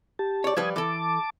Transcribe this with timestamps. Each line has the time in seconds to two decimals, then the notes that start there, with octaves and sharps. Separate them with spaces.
0.19 G4 A5
0.44 C#5 D5
0.57 F3 G3 B4 D#6 G#6
0.76 E3 A4 A5 D6